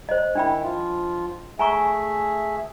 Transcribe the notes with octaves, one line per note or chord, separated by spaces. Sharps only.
C5 D#5
D#3 D4 E4 G5 B5
F3 F4
A3 G#4 E5 G#5 A#5 C#6